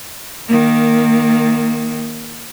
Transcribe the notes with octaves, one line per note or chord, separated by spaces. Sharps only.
D#3 A#3